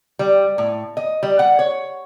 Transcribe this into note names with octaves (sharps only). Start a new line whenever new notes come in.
G3
A2
D#5
G3
F#5
C#5